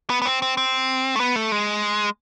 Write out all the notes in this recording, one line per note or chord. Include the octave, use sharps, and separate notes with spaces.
B3
B3
C4
C4
C4
A3
B3
A3
G#3